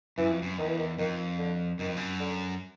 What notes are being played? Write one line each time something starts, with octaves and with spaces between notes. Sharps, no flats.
F#2 E3
F2
F#2
E2 D#3
E3
D#3
F2 D#3
D3
F#2 D#3
F2
F#2
D3